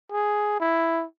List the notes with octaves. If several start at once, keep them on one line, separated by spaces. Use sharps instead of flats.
G#4
E4